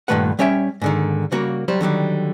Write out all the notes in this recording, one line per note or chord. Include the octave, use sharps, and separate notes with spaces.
G2 A#2 D#3 A3 B4 F#5
G3 C#4 C#5 E5 G5
G#2 D3 D#3
C#3 G3 A#3 F#4 A#4
F#3 G3 C5
D3 D#3 F#3 G3